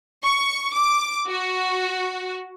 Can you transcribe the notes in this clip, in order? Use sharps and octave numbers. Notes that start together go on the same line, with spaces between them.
C#6
D6
F#4